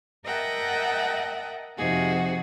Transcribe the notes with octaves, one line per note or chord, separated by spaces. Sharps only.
A#4 D#5 E5 F#5 G5 A5
F2 C3 F3 D#4 F#4 G#4